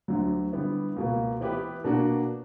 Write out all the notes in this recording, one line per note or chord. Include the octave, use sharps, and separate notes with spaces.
D2 D3 F#3
D3 G3 B3 E4
C#2 B2 A#3
E3 B3 E4 G4 B4
B2 A#3 D4 F#4